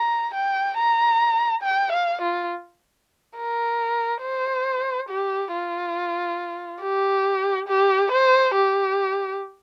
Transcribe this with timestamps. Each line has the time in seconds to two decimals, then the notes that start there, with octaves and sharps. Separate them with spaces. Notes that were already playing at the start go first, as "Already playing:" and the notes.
Already playing: A#5
0.34 G5
0.77 A#5
1.63 G5
1.92 F5
2.22 F4
3.37 A#4
4.22 C5
5.09 G4
5.53 F4
6.81 G4
7.68 G4
8.12 C5
8.55 G4